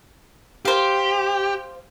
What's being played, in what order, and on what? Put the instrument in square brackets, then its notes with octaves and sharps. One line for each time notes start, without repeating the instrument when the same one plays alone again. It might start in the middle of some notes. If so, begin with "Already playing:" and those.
[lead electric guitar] G4 [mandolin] C5 F5